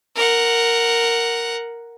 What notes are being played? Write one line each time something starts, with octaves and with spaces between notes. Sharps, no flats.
A#4 F#5